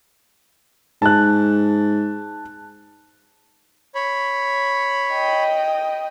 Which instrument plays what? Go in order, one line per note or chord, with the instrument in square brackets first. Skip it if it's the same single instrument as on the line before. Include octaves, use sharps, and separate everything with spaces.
[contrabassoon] G#2 [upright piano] A5 F#6
[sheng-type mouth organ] C#5 B5
[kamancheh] D#5 G5